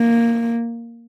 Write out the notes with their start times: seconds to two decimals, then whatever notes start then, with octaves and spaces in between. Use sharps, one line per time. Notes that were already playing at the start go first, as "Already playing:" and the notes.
Already playing: A#3